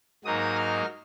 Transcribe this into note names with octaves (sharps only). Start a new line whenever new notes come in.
G#2 F#3 A#3 D#4 D#6
F6